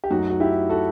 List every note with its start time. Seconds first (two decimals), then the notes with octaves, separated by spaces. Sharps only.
0.04 G4
0.10 F#2 F#3 A3 D#4 F#4
0.30 F#4
0.40 E4 G4
0.69 F#4 A4